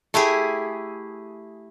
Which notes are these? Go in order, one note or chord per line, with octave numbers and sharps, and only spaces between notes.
A3 E4 G4 G#4